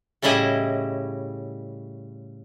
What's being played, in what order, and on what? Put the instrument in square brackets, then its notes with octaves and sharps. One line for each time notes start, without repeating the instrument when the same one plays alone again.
[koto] A2 C#3 G3 E4 D#5